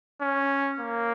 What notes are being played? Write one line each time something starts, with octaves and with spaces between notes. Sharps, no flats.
C#4
A#3